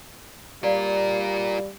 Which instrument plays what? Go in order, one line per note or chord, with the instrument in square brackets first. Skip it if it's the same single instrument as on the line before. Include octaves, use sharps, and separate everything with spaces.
[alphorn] G3 [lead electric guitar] F4 A#4 [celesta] D5 F5